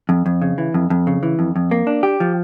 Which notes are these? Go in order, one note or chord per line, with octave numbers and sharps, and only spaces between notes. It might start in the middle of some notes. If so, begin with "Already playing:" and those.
F2
F2
C#3
E3
F2
F2
C#3
E3
F2
F2
A#3
D4
G4
F3